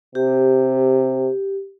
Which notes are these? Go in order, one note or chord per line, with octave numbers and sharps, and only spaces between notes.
C3 G4